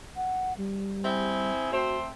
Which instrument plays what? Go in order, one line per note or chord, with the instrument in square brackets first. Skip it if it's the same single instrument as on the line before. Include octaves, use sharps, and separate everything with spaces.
[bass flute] F#5
G3
[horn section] C4 E4 G#4
[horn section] A3 C4 C5 [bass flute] F#4